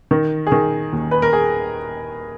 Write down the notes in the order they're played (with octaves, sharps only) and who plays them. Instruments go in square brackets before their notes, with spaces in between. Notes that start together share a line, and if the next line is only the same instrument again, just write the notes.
[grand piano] D#3 A#4
G#4
D#3 A#4
D#2
B4
A#4
G#4